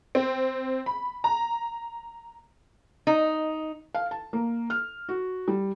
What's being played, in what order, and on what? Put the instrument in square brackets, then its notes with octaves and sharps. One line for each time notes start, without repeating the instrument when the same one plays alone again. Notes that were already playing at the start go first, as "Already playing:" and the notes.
[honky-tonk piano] C4
B5
A#5
[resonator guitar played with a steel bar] D#4
[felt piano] F5
A5
A#3
F6
F#4
G3